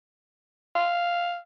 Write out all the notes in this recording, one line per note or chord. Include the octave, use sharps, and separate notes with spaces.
F5